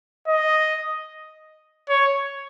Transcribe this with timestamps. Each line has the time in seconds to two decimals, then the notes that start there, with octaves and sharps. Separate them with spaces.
0.28 D#5
1.89 C#5